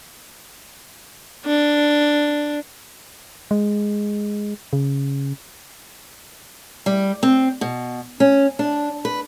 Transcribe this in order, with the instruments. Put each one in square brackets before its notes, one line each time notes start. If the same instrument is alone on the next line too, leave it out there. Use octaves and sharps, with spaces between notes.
[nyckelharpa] D4
[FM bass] G#3
C#3
[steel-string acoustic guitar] G3
C4
B2
C#4
D4
B4